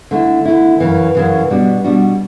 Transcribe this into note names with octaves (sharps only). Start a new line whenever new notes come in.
D3 A3 E4
D3 A3 E4
F#2 C#3 E3
F#2 C#3 E3
B2 G3 D4 F#4
B2 G3 D4 F#4